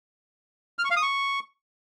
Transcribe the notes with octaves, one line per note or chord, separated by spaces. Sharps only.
F6
C#6
F5
D#6
C#6